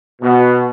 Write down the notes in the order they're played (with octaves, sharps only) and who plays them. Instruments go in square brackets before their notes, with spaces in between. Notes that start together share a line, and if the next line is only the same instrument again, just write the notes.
[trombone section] B2